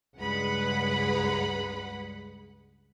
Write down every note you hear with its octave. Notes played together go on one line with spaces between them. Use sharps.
C#2 G2 G#3 B4 F#5 B5